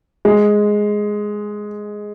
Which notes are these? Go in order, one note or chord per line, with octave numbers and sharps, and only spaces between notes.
G#3